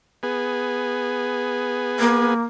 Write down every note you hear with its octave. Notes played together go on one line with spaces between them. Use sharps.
B3 G#4
A#3